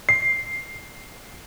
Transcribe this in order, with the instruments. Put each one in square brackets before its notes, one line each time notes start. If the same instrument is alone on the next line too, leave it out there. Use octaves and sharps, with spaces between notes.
[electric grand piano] C7